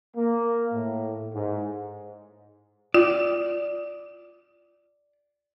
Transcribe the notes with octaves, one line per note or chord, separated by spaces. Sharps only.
A#3
A2
G#2
F4 D5